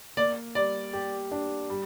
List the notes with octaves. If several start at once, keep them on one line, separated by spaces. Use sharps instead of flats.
A#3 D5
G3 D5
G4
D4
G3